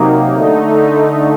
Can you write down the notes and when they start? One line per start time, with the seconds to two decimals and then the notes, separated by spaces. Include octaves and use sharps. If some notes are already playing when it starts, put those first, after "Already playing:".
Already playing: C3 F#3 A#3 D#4
0.34 D3 A3 D#4